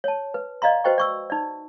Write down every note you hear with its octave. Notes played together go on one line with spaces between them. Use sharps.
C#5 A5
B4
D5 D#5 F5 A#5 C6
F#4 B4 C5 D#5 G5 C#6
D5 C#6 E6
D#4 D5